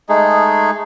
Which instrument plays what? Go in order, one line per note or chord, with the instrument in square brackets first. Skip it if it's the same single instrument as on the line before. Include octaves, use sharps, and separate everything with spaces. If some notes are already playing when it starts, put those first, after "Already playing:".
[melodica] G#3 A3 D#4 G#4